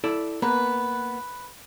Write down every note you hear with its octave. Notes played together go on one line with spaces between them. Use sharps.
E4 A4 D5
A#3 B3 B4